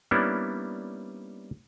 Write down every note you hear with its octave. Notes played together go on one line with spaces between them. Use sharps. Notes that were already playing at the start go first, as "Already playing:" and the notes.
G3 A#3 B3 C#4 D4 E4